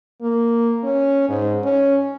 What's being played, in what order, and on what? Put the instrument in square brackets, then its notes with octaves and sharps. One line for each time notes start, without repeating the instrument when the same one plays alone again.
[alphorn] A#3
C#4
G#2
C#4